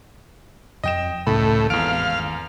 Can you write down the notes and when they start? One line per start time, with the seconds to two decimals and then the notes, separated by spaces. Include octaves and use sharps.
0.84 F2 D#5 G5 E7
1.27 C#2 A2 D#3 C#4 B5
1.70 G#1 E2 F5 D7